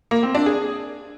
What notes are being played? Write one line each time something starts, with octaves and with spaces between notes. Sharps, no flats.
A#3
C4
D4
G#4